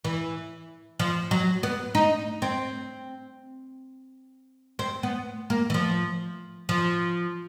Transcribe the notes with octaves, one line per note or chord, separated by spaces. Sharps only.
E3
F3
F#3
B3
D#4
C4
C4
B3
A#3
E3
F3
F3